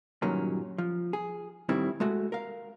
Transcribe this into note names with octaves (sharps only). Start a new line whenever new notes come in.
G2 A#2 D#3 F#3 A#3 C#4
F3
G#4
A2 D#3 G3 C4 E4
G#3 A3 F#4
A#4 F5